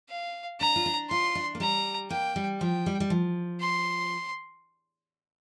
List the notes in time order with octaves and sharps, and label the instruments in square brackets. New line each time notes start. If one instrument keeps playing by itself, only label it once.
[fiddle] F5
[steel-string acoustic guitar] D4 [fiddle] A#5
[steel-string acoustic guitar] F4
D4
[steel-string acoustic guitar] F4 [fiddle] C6
[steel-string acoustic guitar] D4
A#3
[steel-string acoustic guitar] G3 [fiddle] A#5
[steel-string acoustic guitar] A#3 [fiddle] G5
[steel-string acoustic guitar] G3
[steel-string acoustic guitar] F3 [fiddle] G5
[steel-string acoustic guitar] G3
G3
F3
[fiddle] C6